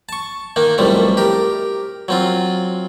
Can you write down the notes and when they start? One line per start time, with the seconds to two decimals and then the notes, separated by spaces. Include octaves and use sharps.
0.09 A5 C#6
0.56 D#3 A#3 D#4
0.78 B1 A2 C3 F3 G3 A3
1.17 G4 A#4
2.08 F#3 C4 F4